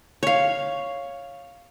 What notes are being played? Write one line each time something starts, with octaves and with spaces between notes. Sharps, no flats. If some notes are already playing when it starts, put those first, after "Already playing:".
C#5 F5